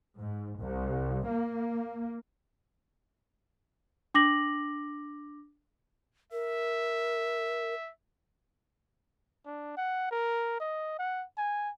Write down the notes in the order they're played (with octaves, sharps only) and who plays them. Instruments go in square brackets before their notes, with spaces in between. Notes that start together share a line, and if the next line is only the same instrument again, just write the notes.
[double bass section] G#2
C2
A#3
[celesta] D4 D6 A#6 F#7
[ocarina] A#4 [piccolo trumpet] E5
[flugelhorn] D4
F#5
A#4
D#5
F#5
G#5